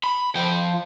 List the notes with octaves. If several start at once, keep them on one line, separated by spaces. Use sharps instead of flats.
B5
F3 G5